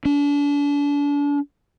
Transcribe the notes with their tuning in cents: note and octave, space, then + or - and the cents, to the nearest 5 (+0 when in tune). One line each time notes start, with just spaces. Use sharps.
D4 -35